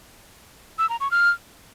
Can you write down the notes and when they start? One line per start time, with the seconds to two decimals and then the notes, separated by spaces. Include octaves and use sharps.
0.78 E6
0.89 A#5
1.00 C#6
1.11 F6